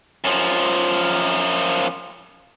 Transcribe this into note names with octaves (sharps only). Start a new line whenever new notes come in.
F#2 F3